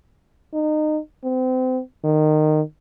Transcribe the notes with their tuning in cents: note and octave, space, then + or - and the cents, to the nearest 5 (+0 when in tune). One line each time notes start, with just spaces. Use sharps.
D#4 -25
C4 -30
D#3 -20